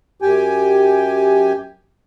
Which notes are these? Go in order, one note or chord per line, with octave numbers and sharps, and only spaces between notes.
F#2 G4 G5 G#5